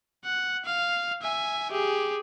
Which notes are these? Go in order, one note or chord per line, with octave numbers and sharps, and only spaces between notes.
F#5
F5
E5 G#5
G4 G#4